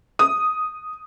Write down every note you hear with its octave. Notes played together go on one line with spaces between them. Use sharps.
D#6